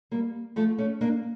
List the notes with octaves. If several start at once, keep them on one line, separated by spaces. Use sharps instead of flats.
G3 A#3
F3 A3
A3 C#4
A#3 D4